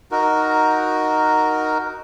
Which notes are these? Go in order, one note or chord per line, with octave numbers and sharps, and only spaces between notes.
D#4 F#4 A#4